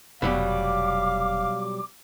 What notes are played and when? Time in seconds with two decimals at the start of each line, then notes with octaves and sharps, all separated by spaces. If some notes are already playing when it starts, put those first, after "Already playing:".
0.22 F1 B2 F#3 G3 F5 D6